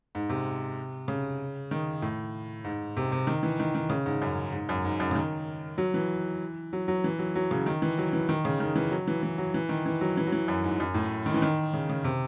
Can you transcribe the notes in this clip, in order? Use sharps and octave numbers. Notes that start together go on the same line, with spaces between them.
G#2
C3
C#3
D#3
A2
G#2
C3
C3
D#3
E3
D#3
D#3
C#3
G#2
F#2
G#2
F#2
G#2
F#2
C#3
D#3
F#3
E3
F#3
F#3
E3
F#3
F#3
C#3
D#3
E3
F#3
E3
D#3
C#3
D#3
E3
F#3
E3
E3
F#3
E3
D#3
E3
F#3
E3
F#3
E3
F#2
G#2
F#2
A2
D#3
E3
D#3
C#3
C#3
C3